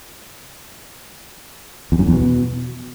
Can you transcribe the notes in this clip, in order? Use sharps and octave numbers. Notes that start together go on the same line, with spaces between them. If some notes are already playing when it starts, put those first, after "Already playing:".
E2
F#2
E2
B2